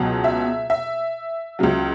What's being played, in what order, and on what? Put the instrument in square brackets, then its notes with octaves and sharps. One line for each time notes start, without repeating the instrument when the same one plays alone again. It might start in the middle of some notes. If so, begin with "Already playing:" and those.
Already playing: [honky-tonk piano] C#2 B2 F#3
E5
E5
C#2 C#3 F#3